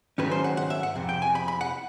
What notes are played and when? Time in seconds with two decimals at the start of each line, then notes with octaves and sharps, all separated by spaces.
0.18 G#2 D#3 F#3 A3 C#4 B4
0.31 C5
0.44 F#5
0.57 F#5
0.70 E5
0.83 F#5
0.95 F2 C3
1.09 G5
1.22 G#5
1.35 B5
1.48 B5
1.61 F#5